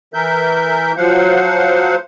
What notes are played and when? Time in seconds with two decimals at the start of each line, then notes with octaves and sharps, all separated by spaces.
0.14 E3 A#4 E5 G6
0.97 F3 F#3 C5 F5 F#5